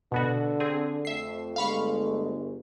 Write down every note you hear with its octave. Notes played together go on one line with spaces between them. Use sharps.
B2 D3 B3 F#4
C4 G#4
F2 A3 E5 C7
G1 G#3 A3 F5 B5 C#6